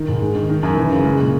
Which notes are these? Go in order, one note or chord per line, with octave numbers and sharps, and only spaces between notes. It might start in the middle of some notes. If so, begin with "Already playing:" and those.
Already playing: D#3
G#2
G#3
D#3
D#3
F#2
E3
C#3
G#3
A#2